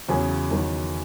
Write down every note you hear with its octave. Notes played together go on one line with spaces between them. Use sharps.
E2 C#3 F#3 C#4 G#4
E2 D#3 F#3